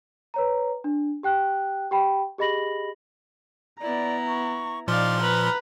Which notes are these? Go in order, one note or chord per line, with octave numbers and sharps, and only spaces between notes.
B4 C#5 A#5
D4
G4 G5 F#6
G4 G5 B5
G4 G#4 D#5 B5 A#6 F#7
B3 E4 D5 A#5
C#6
A#2 F3 D#4 D5 F5 C6 F6
B4 A#5 B5